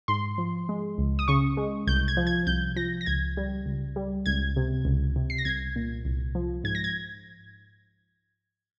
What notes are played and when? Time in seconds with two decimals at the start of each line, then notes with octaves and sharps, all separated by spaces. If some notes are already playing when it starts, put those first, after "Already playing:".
0.08 G#2 C6
0.38 F3
0.69 G#3
0.98 C#2
1.19 D#6
1.28 C#3 C#6
1.57 G#3
1.87 C2 G6
2.08 G#6
2.17 F3
2.27 G#6
2.47 C2 G6
2.76 F3 A#6
3.01 A#6
3.06 C#2 G#6
3.37 G3
3.66 C#2
3.96 G3
4.26 C#2 G#6
4.56 C3
4.85 C#2
5.16 C3
5.30 C7
5.38 A#6
5.45 C2 G#6
5.76 A#2
6.05 C2
6.35 F3
6.64 G#2 G#6
6.75 A#6
6.84 G#6